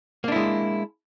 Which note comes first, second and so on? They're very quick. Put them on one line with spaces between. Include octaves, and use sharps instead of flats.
A#3 D4 E4 G#3